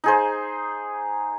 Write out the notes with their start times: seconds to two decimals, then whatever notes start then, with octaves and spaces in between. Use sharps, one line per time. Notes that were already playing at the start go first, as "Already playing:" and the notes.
0.04 D#4 G#4 C5